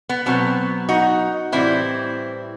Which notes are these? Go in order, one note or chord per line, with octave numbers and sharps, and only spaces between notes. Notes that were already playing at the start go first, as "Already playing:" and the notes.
B3
B2 F#3 B3 C4
D#4 F#4
A2 E3 G3 C4 E4